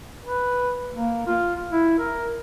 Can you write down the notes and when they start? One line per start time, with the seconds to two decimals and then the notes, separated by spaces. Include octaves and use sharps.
0.25 B4
0.91 A#3
1.27 F4
1.72 E4
1.99 A#4